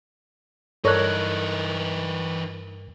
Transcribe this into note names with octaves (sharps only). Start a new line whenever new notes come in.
G2 E3 D#4 A4 A#4 C#5 D5 F#6